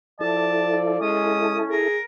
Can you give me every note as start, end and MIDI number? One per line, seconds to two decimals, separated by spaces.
0.21 0.99 53
0.21 1.88 64
0.21 1.88 69
0.21 1.00 74
0.21 0.80 81
1.01 1.60 56
1.01 1.76 61
1.01 1.58 87
1.70 1.97 68
1.70 2.02 70